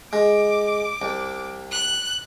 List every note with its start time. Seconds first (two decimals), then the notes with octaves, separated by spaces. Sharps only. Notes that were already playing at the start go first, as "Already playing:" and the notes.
0.13 G#3 D6
1.02 C2
1.71 F#6